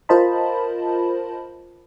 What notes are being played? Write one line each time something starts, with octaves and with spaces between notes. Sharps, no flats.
F4 A#4 C5 D#5 A5 B5